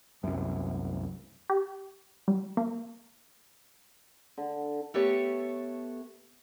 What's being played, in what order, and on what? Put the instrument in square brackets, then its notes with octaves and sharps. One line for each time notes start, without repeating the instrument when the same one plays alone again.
[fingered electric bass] C2 F#2
[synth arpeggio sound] G4
G3
A#3
[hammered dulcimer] D3
[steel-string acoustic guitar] A3 B3 G4 A4 C#5